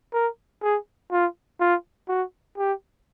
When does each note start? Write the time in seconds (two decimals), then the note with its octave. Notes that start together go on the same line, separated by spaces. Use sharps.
0.13 A#4
0.62 G#4
1.12 F4
1.60 F4
2.08 F#4
2.58 G4